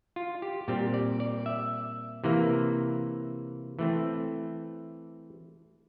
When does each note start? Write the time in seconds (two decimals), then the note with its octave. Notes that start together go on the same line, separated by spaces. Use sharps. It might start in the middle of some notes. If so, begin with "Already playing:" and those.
0.16 F4
0.42 G4
0.68 A#2 G3 C4 G4
0.94 D5
1.20 D5
1.46 E5
2.24 C3 E3 A#3
3.79 E3 A3 C4